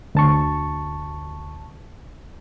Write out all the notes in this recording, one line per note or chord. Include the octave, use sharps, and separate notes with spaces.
D2 A5 C#6